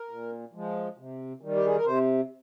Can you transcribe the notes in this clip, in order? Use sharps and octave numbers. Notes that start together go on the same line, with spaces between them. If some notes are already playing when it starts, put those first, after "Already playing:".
Already playing: A#4
A#2
F3 G#3
C3
D#3 G3
G4
G#4
A#4
C3 C5